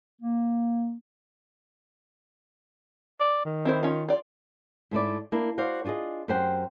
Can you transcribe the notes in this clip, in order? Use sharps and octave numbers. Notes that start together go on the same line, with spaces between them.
A#3
D5
D#3
C4 E4 C5
C#4 F4
F4 D5
G#2 A3 E4 D5
A#3 D4 E4
F#4 C5 D5 F5
D4 F4 F#4 G#4 D#5
F#2 C4 G4 C5 F#5 G5